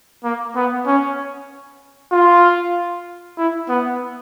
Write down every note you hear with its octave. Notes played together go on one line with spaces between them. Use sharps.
A#3
B3
C#4
F4
E4
B3